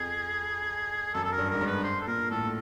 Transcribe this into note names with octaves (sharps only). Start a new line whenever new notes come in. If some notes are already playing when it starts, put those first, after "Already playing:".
Already playing: F2 G#4
F#2 A4
A4
A#4
G2
G#2 A#4
G2
B4
C5
A4
A#2 A#4
A2 A4